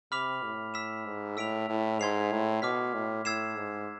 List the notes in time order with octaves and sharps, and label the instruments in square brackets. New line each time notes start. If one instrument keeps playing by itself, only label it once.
[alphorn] C3 [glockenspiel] B5 D6 F6 B6 F7
[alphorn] A2
[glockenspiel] E6 B6 E7
[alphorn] G#2
[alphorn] A2 [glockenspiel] E6 B6 D7 F7
[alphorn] A2
[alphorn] G#2 [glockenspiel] C6 G#6 C7 F7
[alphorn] A2
[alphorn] B2 [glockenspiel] D6 F6 B6
[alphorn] A2
[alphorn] A2 [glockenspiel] E6 G#6 C7 E7
[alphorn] G#2